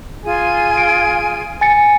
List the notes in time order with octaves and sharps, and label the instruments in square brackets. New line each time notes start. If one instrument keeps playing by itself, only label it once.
[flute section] F4 G#4 G#5
[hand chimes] D7
G#5 A6 C#7